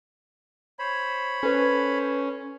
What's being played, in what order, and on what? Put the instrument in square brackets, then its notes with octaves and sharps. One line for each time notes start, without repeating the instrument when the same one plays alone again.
[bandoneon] C5 C#5 B5
[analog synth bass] C#4 [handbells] A4 B4